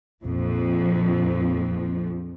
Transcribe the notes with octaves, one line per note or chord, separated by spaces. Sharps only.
A#1 F2 F3